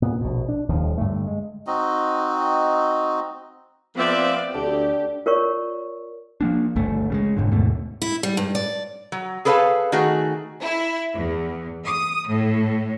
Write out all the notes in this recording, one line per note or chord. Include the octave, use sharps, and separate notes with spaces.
A#2 B3
A#1 B2
D4
D#1 D#2 F3
G2 D3 A3
G#3
C4 D#4 F#4 D#5
F3 B3 C4 D5 E5
D2 D3 G4
F4 A#4 C#5 D5 C#6
F3 A#3 D4
G1 C#2 A3
C#3 G3 G#3
F1 F2 G#2 D3
D#2 G#2 B2 A3
E4
G3
G2
D5
F#3
G#4 A4 B4 C#5 F5 A5
D#3 A3 F#4 G#4
E4
E2
D#6
A2